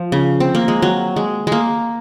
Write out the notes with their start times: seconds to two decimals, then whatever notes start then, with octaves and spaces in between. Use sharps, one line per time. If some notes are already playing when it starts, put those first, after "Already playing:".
Already playing: F3
0.12 C#3
0.40 C4
0.55 A#3
0.68 G#3
0.82 F#3
1.16 G#3
1.47 G#3 A#3